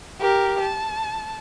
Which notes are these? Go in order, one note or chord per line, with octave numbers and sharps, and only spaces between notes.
G4 A#4
A5